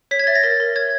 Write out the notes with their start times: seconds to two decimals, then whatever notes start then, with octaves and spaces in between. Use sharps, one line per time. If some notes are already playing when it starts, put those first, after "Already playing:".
0.11 C#5 B6
0.19 G#6
0.27 E5 A6
0.35 A#6
0.43 A#4 A6
0.60 A#4
0.75 C#5 G#6